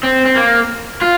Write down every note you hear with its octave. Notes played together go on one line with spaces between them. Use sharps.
C4
C4
A#3
F4